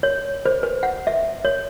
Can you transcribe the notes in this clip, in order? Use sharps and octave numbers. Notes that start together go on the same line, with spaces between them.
C#5
C5
B4
F#5
E5
C#5